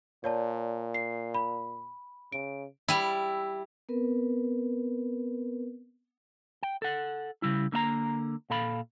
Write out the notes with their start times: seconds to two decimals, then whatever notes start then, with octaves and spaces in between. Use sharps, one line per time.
0.24 A#2 C#5 D5 A5
0.94 C7
1.34 B5
2.32 C#3 D7
2.88 G3 E4
3.89 B3 C4 A#4 B4
6.63 G5
6.82 A4 F#5
7.42 C#3 G3 E4
7.72 D3 A#3 E5 A#5
8.50 A#2 A4 F5 B5